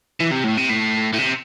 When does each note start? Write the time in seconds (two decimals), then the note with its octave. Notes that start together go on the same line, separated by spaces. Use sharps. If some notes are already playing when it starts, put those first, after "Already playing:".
0.21 E3
0.32 C3
0.44 A2
0.57 C3
0.69 A2
1.13 A2
1.18 C3